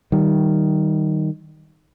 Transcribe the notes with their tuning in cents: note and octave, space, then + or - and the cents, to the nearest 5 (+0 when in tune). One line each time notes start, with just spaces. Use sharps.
D#3 +0 G3 -20